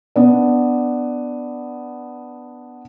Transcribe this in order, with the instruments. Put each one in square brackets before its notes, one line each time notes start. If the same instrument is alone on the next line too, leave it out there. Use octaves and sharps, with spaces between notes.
[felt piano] B3 D4